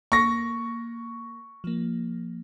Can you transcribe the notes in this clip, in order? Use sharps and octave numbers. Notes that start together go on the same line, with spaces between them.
A#3 C#6 A#6
F3 A#3